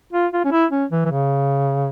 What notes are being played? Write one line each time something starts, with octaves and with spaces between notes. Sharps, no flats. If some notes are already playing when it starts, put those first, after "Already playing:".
F4
F4
C#4
E4
C#4
E3
E3
C#3